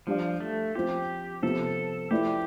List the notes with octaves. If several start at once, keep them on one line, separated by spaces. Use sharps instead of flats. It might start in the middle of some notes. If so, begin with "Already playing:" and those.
F3 G3 D4 G4 D5 F5
A3
F3 C4 F4 G4
C3 F3 B3 A4
F3 A3 E4 G4 B4 D5